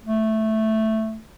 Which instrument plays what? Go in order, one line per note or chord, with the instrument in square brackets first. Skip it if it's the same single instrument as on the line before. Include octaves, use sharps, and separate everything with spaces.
[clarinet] A3